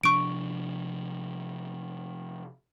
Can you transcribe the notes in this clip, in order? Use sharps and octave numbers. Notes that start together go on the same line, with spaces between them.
C3 F3 D4 C#6 D7